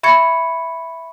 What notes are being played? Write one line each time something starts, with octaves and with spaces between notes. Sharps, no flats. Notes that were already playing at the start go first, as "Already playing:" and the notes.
E5 B5 C#6 G#6 C#7